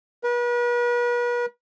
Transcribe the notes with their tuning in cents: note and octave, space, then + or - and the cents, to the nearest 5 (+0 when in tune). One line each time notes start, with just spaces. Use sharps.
B4 -40